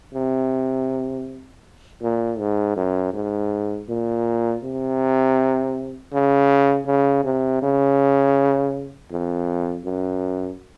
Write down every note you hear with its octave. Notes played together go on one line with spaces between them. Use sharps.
C3
A#2
G#2
F#2
G#2
A#2
C3
C#3
C#3
C3
C#3
F2
F#2